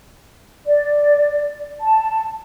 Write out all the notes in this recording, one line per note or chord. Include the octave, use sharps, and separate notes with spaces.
D5
A5